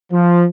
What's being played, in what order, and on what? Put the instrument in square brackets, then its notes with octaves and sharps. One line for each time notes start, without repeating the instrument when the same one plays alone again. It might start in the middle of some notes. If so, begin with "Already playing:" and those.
[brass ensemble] F3